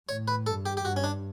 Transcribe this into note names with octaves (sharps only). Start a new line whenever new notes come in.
A2 C#5
B4
G2 A4
G4
G4
G2 F#4
C#4
D4